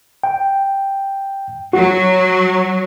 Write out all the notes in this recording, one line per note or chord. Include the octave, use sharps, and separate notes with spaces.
G5
F#3 F#4